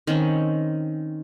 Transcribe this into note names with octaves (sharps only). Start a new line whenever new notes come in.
D#3 C4 C#4